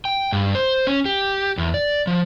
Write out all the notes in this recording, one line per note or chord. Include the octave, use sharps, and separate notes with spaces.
G5
G2
C5
C#4
G4
E2
D5
F3